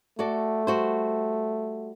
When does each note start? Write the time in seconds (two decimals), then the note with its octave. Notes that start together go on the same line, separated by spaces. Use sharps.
0.19 A3 F#4 A4 D5
0.67 G3 F#4 C5